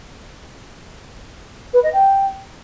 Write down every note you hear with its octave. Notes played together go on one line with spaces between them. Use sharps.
B4
D#5
G5